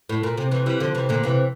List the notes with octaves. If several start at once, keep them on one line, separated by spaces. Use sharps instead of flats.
A2
A#2
C3
C3 E3
E3 G3
D3 F3
C3 E3
A#2 D3
C3 E3